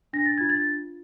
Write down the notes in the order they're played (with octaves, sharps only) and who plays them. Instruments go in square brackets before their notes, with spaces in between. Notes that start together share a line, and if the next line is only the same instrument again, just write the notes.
[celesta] D4 A#6
A6
F4 G#6
A6